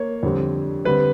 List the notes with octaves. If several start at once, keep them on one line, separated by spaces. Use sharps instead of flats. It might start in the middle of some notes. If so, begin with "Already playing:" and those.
Already playing: A#3 C#5
F2 D3 G3 C4
D3 G3 C4 B4